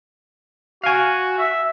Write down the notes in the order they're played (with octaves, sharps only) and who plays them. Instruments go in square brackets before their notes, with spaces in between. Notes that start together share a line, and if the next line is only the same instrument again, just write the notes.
[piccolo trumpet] F#4 [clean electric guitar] F5 G#5
[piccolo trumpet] E5